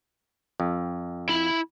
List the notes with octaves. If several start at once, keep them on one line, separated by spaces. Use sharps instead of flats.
F2
E4 B5